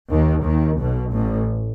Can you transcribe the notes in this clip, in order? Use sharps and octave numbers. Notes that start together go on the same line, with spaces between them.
D#2 D#3
D#2 D#3
B1 B2
A1 A2